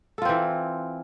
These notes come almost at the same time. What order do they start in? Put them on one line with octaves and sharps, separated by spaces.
A4 F4 C4 E3